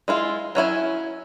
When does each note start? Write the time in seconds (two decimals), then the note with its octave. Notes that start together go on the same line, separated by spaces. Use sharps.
0.08 G#3 E4 F4
0.55 F#3 C#4 E4 G#5